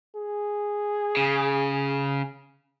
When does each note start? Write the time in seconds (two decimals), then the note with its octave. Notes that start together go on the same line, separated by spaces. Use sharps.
0.16 G#4
1.17 C#3